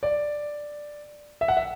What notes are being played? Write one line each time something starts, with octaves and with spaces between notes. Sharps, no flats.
D5
E5
F#5
E5